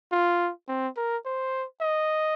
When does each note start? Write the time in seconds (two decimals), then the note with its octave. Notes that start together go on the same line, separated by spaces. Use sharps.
0.12 F4
0.68 C4
0.97 A#4
1.25 C5
1.81 D#5